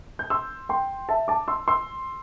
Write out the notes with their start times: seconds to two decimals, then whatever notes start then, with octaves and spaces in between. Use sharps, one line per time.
0.19 G6
0.30 C6 E6
0.69 G5 C6
1.09 E5 A5
1.28 A5 D6
1.48 C6 E6
1.68 C6 E6